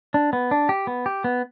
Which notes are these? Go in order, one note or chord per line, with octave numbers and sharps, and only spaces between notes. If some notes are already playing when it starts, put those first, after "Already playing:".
D4
B3
D4
G4
B3
G4
B3